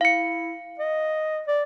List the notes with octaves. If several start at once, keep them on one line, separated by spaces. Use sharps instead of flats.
E4 F5 C#7
D#5
D5